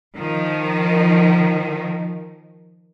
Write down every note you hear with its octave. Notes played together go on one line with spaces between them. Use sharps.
D#3 F3